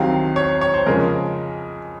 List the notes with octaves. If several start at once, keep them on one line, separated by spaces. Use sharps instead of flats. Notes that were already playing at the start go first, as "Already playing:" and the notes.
Already playing: C2 C3 D#3 F#3 C4 F5
C#5
C#5
C5
F2 C#3 G#3 C#4 A#4